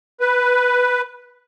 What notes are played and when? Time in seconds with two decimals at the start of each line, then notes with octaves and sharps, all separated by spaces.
0.20 B4